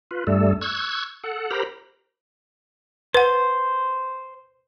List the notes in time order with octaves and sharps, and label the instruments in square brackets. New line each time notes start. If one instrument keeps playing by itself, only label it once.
[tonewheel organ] F4 B4
G2 G3 A3 A4
C#6 E6 F#6 G#6
A4 F#5
G4 A#4 C5 A#5 B5
[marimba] B4 F#5 [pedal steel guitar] C5